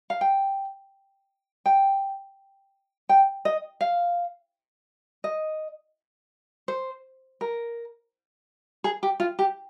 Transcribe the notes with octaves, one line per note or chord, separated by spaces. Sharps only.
F5
G5
G5
G5
D#5
F5
D#5
C5
A#4
G#4
G4
F4
G4